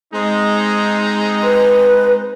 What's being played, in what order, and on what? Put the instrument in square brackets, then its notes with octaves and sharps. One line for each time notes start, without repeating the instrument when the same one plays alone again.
[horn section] G#3 C4 D#4
[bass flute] B4